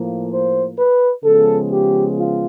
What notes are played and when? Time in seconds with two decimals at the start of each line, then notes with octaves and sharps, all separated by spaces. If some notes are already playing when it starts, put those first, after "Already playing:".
Already playing: A2 F3 A#3
0.30 C5
0.77 B4
1.24 C#3 F3 G#3 B3 A4
1.70 G4
2.18 F4